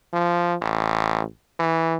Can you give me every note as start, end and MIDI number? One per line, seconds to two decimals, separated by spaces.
0.13 0.54 53
0.61 1.22 33
1.59 1.97 52